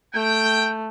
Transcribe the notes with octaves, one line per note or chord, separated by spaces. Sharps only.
A3 G5